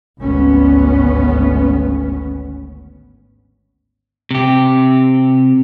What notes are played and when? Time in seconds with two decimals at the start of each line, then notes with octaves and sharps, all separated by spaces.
0.19 G#1 D2 B3 C#4
4.31 C3 G4